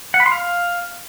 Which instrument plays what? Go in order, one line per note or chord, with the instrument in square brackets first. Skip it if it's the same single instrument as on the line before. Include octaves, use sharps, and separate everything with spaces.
[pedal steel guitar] F#5
B5
C6
F5